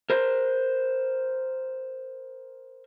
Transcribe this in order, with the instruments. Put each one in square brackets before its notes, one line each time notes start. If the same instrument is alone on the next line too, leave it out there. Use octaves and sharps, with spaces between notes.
[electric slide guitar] A#4 C5